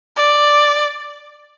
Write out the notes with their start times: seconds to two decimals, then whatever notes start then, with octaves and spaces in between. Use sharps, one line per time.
0.16 D5